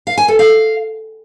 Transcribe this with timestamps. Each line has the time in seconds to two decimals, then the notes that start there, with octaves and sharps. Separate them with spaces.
0.07 F5
0.18 G#5
0.28 A4
0.39 F5